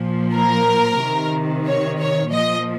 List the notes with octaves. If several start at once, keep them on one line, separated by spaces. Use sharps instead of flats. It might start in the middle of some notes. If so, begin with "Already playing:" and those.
Already playing: A#2 F3
A#4
C3 D#3
C#5
C#5
A#2 F3 D#5